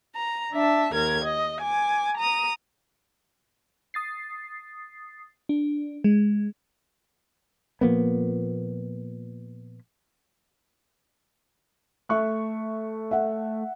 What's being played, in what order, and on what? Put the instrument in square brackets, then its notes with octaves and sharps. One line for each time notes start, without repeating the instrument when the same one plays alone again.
[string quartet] A#5
D4 E5 A5
D#2 A#4 G#6
D#5
G#5 D6
A#5 D#6
[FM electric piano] D#6 A6 C7
D4
G#3
[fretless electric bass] A#2 F3 A#3 B3
[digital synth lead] A3 [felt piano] E5 C#6 F#6
[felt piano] E5 F#5